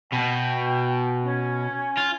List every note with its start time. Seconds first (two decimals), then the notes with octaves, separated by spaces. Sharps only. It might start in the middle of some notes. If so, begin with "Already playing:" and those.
0.12 B2 G5
1.24 C#4
1.97 F4